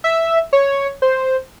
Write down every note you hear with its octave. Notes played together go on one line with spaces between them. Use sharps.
E5
C#5
C5